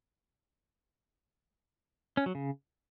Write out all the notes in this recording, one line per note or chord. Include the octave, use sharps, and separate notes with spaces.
C#4
F#3
C#3